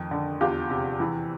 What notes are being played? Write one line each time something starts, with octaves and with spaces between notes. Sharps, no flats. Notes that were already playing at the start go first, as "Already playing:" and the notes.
Already playing: F2 D#3
D3
E2 F4 G4
C3
E3